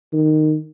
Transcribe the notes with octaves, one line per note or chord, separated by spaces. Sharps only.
D#3